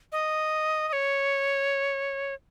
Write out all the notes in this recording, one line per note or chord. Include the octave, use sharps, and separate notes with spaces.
D#5
D#5
C#5